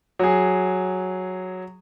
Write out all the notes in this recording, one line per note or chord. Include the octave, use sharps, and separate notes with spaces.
F#3 G#4